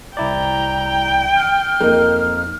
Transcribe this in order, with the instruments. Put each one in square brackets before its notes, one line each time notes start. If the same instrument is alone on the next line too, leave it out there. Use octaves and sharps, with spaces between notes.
[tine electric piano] C2 E4 D5 [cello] G5 [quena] A#5
[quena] F6
[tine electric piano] F2 D#4 [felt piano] A#3